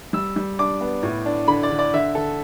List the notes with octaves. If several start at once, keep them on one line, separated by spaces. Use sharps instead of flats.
G3 E6
G3
D4 D6
B3
A2
D4
D3 B5
D5
D3
D5
D3 E5
D3 A4